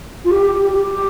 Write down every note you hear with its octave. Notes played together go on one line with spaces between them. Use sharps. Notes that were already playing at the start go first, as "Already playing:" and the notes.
F4
G4
G4
G4
G4